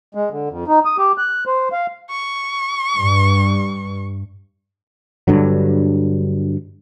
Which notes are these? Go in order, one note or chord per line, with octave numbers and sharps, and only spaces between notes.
G#3
D3
F2
D#4
D#6
G4
F#6
C5
F5
C#6
G2
G2 D3 F#3